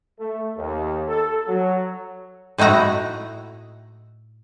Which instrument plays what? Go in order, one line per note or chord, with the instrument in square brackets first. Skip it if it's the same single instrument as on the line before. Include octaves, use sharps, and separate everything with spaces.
[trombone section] A3
D#2
A4
F#3
[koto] A2 D#4 E4 F#4 A#5